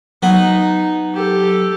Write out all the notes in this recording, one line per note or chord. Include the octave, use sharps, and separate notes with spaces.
F#3 B3 D#4
G4 A4